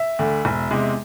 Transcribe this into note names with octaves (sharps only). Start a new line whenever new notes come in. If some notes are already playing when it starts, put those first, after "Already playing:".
Already playing: E5
D2 D3
E1
E2 C3 G#3